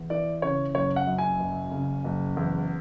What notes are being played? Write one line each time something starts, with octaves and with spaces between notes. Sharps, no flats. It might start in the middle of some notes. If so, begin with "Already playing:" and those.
Already playing: E2
E3 D5
C#3 C#5
F#1 C#5
F#5
F#2
G#5
F#1
C#3
F#1
E2